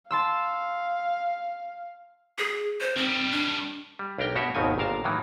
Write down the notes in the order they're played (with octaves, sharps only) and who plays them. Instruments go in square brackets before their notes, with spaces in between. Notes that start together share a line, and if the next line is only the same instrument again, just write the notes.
[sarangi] F5 [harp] A5 C6 E6
[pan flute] G#4
C5
[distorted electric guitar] D#3 G3 [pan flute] C4
[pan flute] D4
[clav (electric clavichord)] G3
B1 D4 G4 A#4 G5
B2 F#4 G4 C#5 E5
G#1 D#2 B2 D#3 C4 G#5
G1 A#2 A#4 F5 A5
A2 D#3 E3 F#3